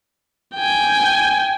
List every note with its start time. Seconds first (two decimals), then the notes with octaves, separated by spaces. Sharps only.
0.55 G5 G#5